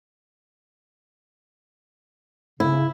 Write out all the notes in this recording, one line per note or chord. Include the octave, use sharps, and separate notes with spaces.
C#3 E4